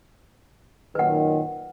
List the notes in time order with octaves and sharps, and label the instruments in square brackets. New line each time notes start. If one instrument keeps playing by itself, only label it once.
[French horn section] F#2 A#2 D#3 [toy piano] B4 F#5